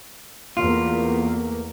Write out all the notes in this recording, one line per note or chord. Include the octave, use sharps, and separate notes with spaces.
E2 A3 A#3 F4